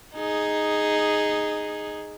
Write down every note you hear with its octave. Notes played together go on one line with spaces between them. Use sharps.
D#4 G#4